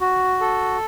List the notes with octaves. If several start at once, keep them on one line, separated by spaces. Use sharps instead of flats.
F#4
A4